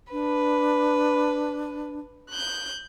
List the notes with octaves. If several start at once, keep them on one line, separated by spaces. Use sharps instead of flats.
D4 B4
F#6 G6